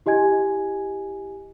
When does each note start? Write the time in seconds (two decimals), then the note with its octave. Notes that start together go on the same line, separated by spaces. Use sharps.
0.06 E4 G4 D#5 G#5 G#6